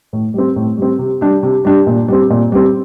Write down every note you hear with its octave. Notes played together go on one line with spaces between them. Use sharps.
A2
G3 C4
A2
G3 C4
C3
G3 D4 G4
C3
G3 D4 G4
A#2
G3 C4
A#2
G3 C4